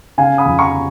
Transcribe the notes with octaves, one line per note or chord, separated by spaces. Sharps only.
C#3 F5 G#5
B5 D#6
F2
A#5 C#6